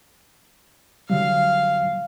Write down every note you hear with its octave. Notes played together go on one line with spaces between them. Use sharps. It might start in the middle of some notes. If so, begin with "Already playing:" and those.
D3 F#3 G3 F5